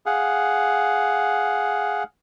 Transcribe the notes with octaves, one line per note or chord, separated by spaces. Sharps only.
G#4 F5 F#5